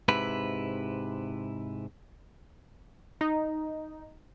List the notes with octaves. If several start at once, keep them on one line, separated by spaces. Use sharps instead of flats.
G#2 C3 E4 B4
D#4